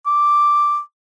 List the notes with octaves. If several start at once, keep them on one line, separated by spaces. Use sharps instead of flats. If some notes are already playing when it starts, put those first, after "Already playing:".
D6